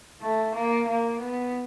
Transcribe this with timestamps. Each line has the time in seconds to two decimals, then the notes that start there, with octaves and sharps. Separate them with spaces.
0.22 A3
0.54 A#3
0.87 A#3
1.19 B3